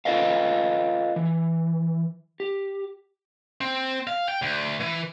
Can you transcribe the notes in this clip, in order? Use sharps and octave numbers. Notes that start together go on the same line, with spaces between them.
F4 A4 B4 D#5 F5
E3
G4
C4
F5
G5
D2
E3